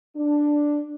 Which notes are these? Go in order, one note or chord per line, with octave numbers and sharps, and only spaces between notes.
D4